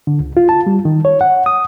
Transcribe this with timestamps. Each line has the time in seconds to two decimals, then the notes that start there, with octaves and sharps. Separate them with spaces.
0.07 D3
0.20 C#2
0.37 F4
0.49 A5
0.67 G3
0.85 D#3
1.05 C#5
1.21 F#5
1.46 D#6